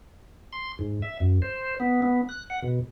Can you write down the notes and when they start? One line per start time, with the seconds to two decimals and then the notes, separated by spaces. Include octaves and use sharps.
0.53 C6
0.79 G#2
1.02 E5
1.20 F#2
1.42 C5
1.80 B3
2.02 B3
2.29 F#6
2.50 F#5
2.63 B2